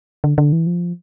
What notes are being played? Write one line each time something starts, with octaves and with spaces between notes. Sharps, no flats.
D3
D3
E3
F3